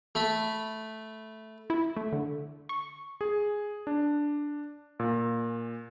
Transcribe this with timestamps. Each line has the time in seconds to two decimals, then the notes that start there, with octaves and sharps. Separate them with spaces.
0.15 A3 B5
1.70 E4
1.97 A3
2.12 D3
2.69 C#6
3.21 G#4
3.87 D4
4.99 A#2